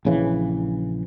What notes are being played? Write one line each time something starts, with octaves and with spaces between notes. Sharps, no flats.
A#1 C#3 E3